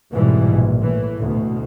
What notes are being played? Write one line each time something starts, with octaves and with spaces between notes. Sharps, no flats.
F2 G#2 B2 E3 G3
A#1
A2 E3
D2 B2